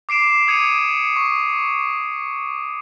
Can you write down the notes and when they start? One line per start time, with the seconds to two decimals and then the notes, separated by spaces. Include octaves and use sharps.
0.09 D6 C7 D7 E7
0.47 D6 D#6 G#6 C#7 D#7 F7
1.16 C#6